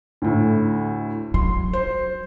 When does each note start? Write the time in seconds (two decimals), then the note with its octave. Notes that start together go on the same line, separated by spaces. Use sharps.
0.22 D2 A2
1.34 F#3 C6
1.73 C5